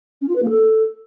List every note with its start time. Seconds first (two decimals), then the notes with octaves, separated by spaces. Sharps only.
0.21 C#4
0.28 F4
0.35 B4
0.42 A#3
0.49 A4